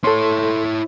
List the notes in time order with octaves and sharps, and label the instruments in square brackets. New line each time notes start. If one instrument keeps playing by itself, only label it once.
[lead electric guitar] E4 C#5 [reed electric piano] A4 C6